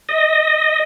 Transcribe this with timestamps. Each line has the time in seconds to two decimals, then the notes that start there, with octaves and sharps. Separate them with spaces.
0.09 D#5